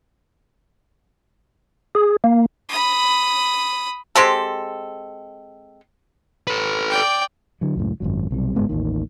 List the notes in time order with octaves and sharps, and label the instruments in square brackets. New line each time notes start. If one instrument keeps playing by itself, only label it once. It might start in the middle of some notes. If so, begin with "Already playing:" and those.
[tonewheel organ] G#4
A#3
[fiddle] B5 D#6
[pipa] G#3 C4 G4 A4
[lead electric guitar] A4 B4
[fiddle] D5 G5
[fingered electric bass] D3 F#3
C#2 F#2 A2
G#1 F#2 F#3
B1 C3 G3
F#1 G#2 G#3 B3
A1 D#2 D#3